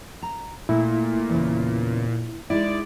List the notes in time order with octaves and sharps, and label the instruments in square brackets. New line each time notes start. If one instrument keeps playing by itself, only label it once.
[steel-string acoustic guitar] A#5
[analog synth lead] A#2 [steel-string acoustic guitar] A3 [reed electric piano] E4
[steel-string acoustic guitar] E2 C#3
[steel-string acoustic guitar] G#3 D#4 E4 [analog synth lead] D5